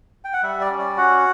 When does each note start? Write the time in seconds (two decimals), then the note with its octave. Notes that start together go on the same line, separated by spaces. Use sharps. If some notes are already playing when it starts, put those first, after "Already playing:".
0.25 G5
0.33 F#5
0.43 G3 E5
0.61 D5
0.70 C#4
0.79 D5
0.97 F#4 F#5